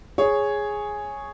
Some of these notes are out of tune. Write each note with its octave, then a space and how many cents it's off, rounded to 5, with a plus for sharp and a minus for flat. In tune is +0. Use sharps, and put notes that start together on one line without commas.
G#4 +0 C#5 +0